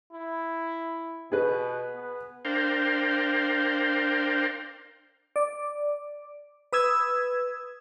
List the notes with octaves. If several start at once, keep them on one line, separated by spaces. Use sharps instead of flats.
E4
B2 G#4 B4
B3
D4 A#4 C5 F5 G5
D5
B4 D#6 E6 G#6